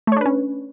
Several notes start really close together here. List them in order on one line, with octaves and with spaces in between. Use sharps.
A3 C#5 D4 B4 C#4